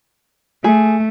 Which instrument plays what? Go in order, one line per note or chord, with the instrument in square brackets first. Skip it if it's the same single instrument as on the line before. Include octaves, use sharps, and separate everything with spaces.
[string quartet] A3 [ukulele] G#4